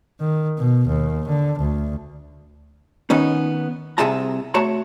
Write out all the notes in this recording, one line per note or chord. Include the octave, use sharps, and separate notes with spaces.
D#3
B2
D#2
D3
D2
D#3 B3 C#4 D#4
C2 C3 G#4 E5 A5 A#5
A3 F#4 C#5 A5 A#5